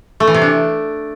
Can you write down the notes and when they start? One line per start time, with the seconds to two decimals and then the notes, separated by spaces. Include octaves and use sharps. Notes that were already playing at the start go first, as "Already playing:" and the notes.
0.20 A3
0.27 E3
0.34 C3
0.42 D4